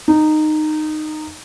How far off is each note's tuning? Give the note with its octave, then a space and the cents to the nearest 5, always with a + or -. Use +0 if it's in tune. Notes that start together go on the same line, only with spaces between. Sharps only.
D#4 -15